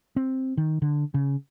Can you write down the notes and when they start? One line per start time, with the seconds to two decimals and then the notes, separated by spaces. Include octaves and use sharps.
0.16 C4
0.57 D#3
0.82 D3
1.14 C#3